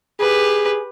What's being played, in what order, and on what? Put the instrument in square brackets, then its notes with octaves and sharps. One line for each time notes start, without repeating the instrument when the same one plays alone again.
[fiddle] G4 B4 [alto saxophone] G#4